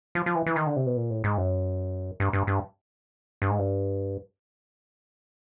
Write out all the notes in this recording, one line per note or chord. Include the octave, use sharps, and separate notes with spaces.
F3
F3
E3
E3
D#3
D3
C3
B2
A#2
A2
G#2
F#2
G2
G2
G2
G2
G#2
G2